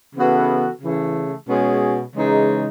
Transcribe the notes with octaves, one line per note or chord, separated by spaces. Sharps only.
C#3 E3 B3 F#4 A4
C#3 E3 A3
B2 G#3 C#4 G#4
C#3 E3 G#3 D#4